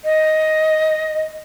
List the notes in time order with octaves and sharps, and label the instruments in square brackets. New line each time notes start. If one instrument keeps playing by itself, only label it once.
[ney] D#5